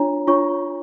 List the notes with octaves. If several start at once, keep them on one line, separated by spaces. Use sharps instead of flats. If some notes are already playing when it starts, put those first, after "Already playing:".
Already playing: D4 F4 C#5 A#5
D4 F4 C#5 C#6